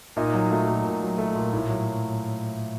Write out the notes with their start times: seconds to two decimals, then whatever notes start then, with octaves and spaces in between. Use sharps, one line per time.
0.16 A#2 D#4
0.34 F#3
0.51 A3 F#4
0.68 A#2
0.84 A#2
1.02 F#3
1.18 A3
1.35 A#2
1.53 A2
1.70 F#3